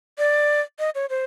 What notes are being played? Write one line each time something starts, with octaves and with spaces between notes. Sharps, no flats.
D5
D#5
C#5
C5